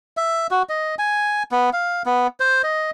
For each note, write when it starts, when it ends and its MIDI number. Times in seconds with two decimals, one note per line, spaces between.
0.17 0.47 76
0.51 0.63 66
0.69 0.95 75
0.99 1.43 80
1.52 1.70 59
1.73 2.03 77
2.06 2.27 59
2.40 2.62 72
2.63 2.91 75